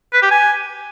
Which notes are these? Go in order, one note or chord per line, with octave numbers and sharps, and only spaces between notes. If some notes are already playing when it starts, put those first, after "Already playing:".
B4
G4
G#5